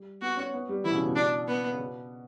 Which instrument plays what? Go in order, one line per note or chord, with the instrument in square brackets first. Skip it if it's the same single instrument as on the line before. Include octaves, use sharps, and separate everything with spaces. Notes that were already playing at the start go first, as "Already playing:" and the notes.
Already playing: [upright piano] G3
[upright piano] B3 [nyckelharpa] F#4
[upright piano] C#4
B3
G3
[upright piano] E3 [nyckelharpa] E4
[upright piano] B2
C#3
B2
[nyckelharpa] D4
B3
[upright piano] C#3
B2